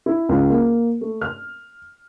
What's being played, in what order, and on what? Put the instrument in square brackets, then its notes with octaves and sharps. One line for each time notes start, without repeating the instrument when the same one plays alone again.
[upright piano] E4
C#2
A#3
A3
F6